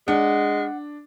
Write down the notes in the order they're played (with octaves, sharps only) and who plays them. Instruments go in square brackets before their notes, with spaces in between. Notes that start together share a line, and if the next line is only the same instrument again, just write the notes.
[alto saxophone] G#3 [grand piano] D4 [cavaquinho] F#5